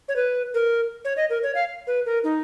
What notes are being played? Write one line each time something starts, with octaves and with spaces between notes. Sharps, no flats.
C#5
B4
A#4
C#5
D#5
A#4
C#5
F5
B4
A#4
D#4